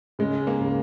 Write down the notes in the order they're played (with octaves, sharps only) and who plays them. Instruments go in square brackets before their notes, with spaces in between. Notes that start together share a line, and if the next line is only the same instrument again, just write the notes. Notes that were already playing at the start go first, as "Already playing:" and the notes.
[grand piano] C#3 [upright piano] G#3
[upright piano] A#3
[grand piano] C#3